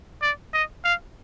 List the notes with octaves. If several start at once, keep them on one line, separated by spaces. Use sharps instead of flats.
D5
D#5
F5